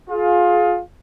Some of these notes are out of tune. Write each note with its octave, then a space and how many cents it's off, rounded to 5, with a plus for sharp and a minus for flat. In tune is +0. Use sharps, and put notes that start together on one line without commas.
F4 +20 G#4 +25